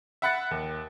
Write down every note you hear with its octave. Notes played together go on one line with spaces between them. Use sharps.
E5 F#5 B5 F#6 A6 C#7
D#2